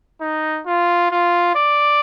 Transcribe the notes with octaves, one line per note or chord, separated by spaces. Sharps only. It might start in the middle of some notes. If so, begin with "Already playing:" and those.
D#4
F4
F4
D5